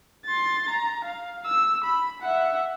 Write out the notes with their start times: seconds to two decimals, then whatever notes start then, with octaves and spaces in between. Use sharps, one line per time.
0.26 C6 A6
0.70 A#5
1.04 F5
1.46 E6
1.84 B5
2.22 E5 F#5